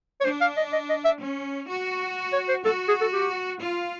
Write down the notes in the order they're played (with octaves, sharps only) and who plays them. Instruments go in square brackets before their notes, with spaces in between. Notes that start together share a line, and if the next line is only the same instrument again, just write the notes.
[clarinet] C#5
[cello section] D4 [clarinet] C5
[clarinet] F5
D#5
D#5
D#5
E5
[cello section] C#4
F#4
[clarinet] C#5
C5
[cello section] F#4 [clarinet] A4
[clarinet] G#4
A4
G4
[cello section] F4